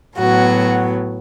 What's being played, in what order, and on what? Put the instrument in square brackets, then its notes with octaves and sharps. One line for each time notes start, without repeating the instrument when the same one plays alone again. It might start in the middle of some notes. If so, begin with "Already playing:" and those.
[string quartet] A2 F#3 B3 F#4